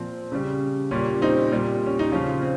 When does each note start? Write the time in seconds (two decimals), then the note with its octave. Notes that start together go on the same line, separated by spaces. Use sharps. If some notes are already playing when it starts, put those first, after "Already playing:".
Already playing: A#2 F3 C4
0.32 C#3 G3
0.91 A#2 G3 C#4
1.22 C4 D#4
1.52 A#2 G3
1.86 C#4
1.99 D#4
2.12 C#3 F3 C#4 F4
2.42 C4